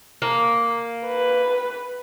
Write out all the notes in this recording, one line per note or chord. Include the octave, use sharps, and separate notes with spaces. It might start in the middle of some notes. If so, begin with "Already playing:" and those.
A#3
B4